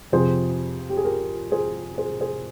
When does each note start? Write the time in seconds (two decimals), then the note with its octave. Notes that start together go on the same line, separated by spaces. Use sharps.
0.12 F2 C3 F3 C4 G#4 C5
0.90 G4
0.97 G#4
1.05 G4 A#4
1.52 G#4 C5
1.98 G#4 C5
2.21 G#4 C5